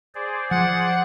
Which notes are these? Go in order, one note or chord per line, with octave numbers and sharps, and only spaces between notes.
G#4 C5 D5
F3 F#5